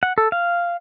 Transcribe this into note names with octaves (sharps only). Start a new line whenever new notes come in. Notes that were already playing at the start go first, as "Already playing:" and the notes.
F#5
A4
F5